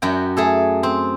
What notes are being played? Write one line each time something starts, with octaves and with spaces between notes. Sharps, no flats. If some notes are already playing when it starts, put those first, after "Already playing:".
F#2 F#4 G5
A3 G#4 A4
C4